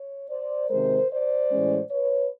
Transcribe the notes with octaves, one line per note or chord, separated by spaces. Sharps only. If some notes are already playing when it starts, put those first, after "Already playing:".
Already playing: C#5
C5 D5
C3 D#3 G#3 A#4 C5
C5 D5
A2 E3 G#3 C#4
B4 C#5